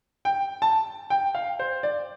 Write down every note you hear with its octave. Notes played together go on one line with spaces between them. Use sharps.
G5
A5
G5
F5
C5
D5